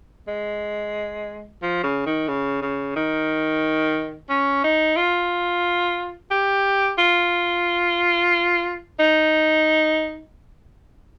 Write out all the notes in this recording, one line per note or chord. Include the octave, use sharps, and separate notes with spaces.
G#3
F3
C#3
D#3
C#3
C#3
D#3
C#4
D#4
F4
G4
F4
D#4